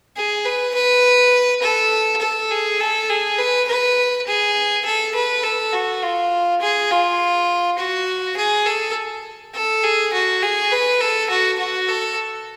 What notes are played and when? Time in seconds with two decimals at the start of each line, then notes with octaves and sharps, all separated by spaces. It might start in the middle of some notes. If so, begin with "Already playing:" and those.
0.16 G#4
0.45 B4
0.74 B4
1.62 A4
2.21 A4
2.51 G#4
2.80 A4
3.09 G#4
3.39 B4
3.68 B4
4.27 G#4
4.85 A4
5.15 B4
5.44 A4
5.73 F#4
6.02 F4
6.61 G#4
6.90 F4
7.78 F#4
8.37 G#4
8.66 A4
9.54 A4
9.84 G#4
10.13 F#4
10.42 G#4
10.71 B4
11.01 A4
11.30 F#4
11.59 F#4
11.89 A4